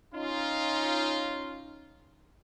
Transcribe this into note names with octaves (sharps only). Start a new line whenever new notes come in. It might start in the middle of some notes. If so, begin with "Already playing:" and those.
C#4 D#4 F4